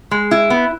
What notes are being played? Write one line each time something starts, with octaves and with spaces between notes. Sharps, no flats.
G#3
E4
B3